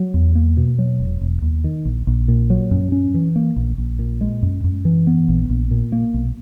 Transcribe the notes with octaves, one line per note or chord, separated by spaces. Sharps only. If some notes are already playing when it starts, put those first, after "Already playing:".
Already playing: F#3
E2
A#3
B2
F#3
E1
E1
D#2
D#3
A#1
A#1
A#2
F#3
F#2
C#4
E3
A#3
A#1
A#1
A#2
G#3
F#2
F#2
E3
B3
A#1
A#1
A#2
A#3
B1